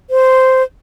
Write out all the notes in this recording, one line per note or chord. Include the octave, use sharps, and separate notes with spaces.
C5